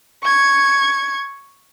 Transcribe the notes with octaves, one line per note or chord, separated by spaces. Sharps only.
C#6 G#6